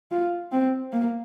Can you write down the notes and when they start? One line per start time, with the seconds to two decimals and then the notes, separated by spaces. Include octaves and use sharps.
0.11 F4
0.52 C4
0.93 A#3